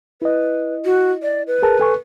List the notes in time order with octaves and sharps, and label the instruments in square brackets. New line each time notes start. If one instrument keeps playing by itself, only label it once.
[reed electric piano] E4 D#5 [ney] B4
[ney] F#4
D5
B4
[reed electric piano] G#4 A#4 A5
A4 G#5 C#6